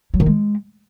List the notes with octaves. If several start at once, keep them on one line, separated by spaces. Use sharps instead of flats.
F#3
D#3
G#3